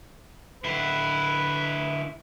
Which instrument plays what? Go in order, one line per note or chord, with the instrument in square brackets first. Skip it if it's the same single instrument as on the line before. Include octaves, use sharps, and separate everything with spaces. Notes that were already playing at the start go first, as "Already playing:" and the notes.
[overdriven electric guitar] D3 E4 [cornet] B4